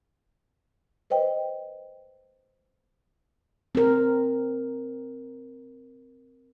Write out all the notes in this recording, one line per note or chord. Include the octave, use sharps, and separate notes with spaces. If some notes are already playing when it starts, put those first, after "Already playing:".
B4 C5 D#5 G5
C4 A#4